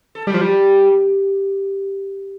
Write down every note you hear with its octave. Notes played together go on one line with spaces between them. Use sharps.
A4
G3 G4
F3
G3